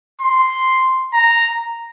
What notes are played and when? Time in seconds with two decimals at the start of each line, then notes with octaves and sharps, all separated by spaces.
0.22 C6
1.14 A#5